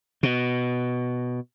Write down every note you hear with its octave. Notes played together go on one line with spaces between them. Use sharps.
B2